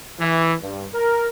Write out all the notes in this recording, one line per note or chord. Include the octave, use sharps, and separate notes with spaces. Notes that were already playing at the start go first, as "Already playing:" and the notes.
E3
G2
A#4